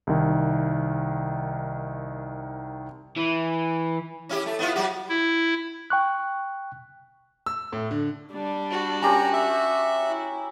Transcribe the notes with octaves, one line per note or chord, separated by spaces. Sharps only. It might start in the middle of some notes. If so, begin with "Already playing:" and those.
C2 D#3
E3
C#4 E4 G4
A3
B3 E4 F4
F#3 F#4 G4
E4
G5 C#6 F#6
E6
A2
D3
G3 D4
F#4
C#4 G4 A#4 A#5
E5
E4